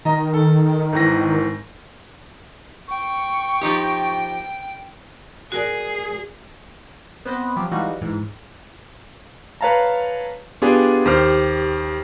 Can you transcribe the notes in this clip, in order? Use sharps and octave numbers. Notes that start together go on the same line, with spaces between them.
D#3 D#5 A#5
A4
G#1 E3 A#6
G5 C#6
F3 D#4 G4
F#4 G#4 A#4 D5
B3 C4 B4 C5 D#5
F3 F#3 G4
E3 G3 G#3 D#4 F4 F#4
G#2 E3
B4 C#5 F5 A5 A#5
B3 D4 F4 G4 G#4
D#2 G4 C5 F6